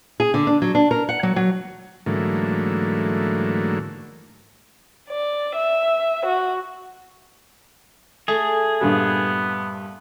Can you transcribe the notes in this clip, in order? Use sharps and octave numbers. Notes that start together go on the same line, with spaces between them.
G#4
D3
D4
F#3
D4
A#4
F#5
F#3
F#3
G#2 D3 E3 F#3 A3 A#3
D5
E5
F#4
A3 G#4
G2 A#2 G3 B3